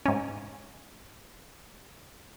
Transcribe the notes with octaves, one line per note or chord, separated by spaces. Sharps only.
G#2 C#4